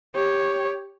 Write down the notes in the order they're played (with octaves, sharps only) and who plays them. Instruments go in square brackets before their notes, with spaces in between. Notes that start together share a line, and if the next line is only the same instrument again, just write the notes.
[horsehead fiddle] G4 C#5